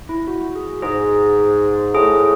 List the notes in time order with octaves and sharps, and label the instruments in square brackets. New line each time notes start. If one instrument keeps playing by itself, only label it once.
[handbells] E4
F#4
G#4
[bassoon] G#2 [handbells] G#4
[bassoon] A2 [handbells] G#4